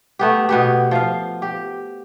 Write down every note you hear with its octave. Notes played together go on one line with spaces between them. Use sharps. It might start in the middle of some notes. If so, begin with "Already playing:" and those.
A3 B3 G4
B2 B3 G4
F3 F5
G4